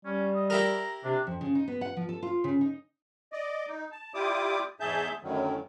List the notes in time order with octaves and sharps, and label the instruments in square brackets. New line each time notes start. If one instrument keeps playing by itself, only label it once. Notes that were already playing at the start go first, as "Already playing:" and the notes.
[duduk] G3 [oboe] C#4
[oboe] D#5
[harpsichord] E4 G4 A#4 [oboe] A#5
[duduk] C3 [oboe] D4
[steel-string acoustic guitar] F2
C#3
D#4
B3
F#5
F3
A4
F4
C#3
D#4
[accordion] D5 D#5
D#4
A5
E4 F4 G4 D5 D6 D#6
E2 G#2 G#4 E5 A5 G6
F#2 A2 D3 D#3 F#3